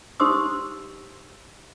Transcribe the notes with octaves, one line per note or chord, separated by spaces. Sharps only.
D#4 G4 C5 C6 D#6 E6